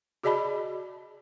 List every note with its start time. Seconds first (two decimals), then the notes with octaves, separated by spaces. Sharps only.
0.24 F#4 G#4 D5 D#5 A5 B5